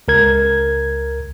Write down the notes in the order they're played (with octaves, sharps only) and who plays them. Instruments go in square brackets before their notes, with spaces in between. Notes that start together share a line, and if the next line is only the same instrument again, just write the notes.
[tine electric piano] C#2 A#4 G#6